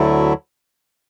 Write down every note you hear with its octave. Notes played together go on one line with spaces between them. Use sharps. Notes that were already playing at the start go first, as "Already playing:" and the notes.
Already playing: D2 D3 F#3 A3 E4